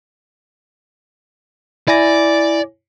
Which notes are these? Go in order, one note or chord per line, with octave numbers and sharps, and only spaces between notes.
E4 D5 G#5 A#6